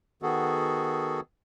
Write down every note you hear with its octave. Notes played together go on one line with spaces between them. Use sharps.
D#3 B3 F#4 G#4 A4